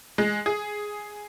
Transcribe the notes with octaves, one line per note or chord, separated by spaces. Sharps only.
G#3
G#4